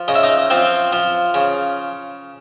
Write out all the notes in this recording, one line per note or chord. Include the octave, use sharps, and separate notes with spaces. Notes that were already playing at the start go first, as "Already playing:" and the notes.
Already playing: F3
C#3 D#5
E5
D#4 D#5
F3 C4 C5
F3
C#3